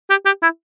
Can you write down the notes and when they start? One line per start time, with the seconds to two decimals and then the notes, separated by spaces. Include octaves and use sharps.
0.10 G4
0.26 G4
0.42 E4